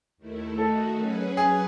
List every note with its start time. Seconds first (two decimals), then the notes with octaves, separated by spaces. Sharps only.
0.17 D#2 D#3 A3 E4
0.57 D#3 A3 D#4 F#4 A4
0.98 F#3 C#4 G#4 B4
1.37 G#4